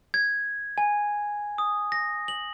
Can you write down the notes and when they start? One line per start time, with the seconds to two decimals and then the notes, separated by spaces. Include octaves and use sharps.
0.14 G#6
0.78 G#5
1.58 D#6
1.92 A#6
2.28 F#7